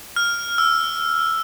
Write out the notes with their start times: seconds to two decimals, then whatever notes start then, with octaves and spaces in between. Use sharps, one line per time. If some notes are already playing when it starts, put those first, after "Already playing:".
0.16 F6
0.58 E6